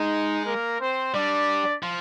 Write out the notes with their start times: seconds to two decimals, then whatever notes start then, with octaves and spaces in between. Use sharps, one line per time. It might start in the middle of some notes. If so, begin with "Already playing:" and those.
Already playing: G#3 D#4
0.46 A#3 A#4
0.80 C4 C5
1.14 G3 D4 D5
1.83 F3